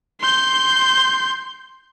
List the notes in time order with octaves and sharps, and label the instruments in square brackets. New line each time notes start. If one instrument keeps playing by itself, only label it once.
[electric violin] C6 G6